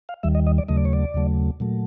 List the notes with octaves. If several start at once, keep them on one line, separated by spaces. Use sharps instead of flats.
F5
D#2 D#3 G3 E5
D#5
D#5
D5
D#2 C#3 F#3 A3 D#5
D5
C#5
D5
D#2 C#3 F#3 A3
A#2 F#3 A3